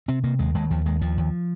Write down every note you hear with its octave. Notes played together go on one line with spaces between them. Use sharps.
C3 C4
C3 A#3
D#2 G#3
D#2 G#3
D#2 F3
D#2 G#3
D#2 F3
D#2